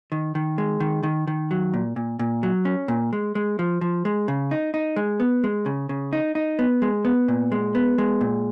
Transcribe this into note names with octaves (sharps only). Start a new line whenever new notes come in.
D#3
D#3
G#3
D#3
D#3
D#3
F#3
A#2
A#2
A#2
F#3
C#4
A#2
G#3
G#3
F3
F3
G#3
C#3
D#4
D#4
G#3
B3
G#3
C#3
C#3
D#4
D#4
B3
G#3
B3
A#2
G#3
B3
G#3
A#2